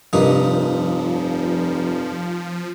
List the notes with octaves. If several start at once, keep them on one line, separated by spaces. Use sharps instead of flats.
F1 G2 C3 F3 D4 D#4 A#4